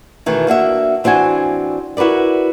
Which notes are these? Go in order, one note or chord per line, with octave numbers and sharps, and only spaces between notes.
B2 D#3 E3 A3
A#3 D4 F#4 E5
E3 C4 D4 F#4 G#5
E4 F#4 A#4 B4 D5